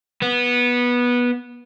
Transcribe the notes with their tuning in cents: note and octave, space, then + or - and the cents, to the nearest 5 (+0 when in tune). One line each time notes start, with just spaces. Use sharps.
B3 -15